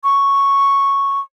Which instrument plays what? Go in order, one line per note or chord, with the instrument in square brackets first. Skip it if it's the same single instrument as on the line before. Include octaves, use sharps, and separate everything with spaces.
[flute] C#6